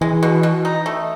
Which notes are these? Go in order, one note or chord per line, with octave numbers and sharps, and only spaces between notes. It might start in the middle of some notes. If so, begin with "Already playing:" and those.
E3 G#3
B2
B2
D#4
A3